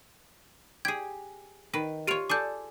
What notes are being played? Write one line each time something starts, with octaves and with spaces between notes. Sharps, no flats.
G4 G#4 G#6
D#3 B4
F4 G4 C#5 D7 F7
G#4 A4 D5 D6 G6